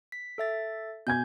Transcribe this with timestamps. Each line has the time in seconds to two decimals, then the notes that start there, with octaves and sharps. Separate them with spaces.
0.12 B6
0.38 A4 E5 A6
1.07 B2 G#5 G6 G#6